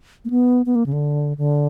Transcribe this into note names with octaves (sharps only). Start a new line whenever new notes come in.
A#3
B3
B3
A#3
C#3
D3
D3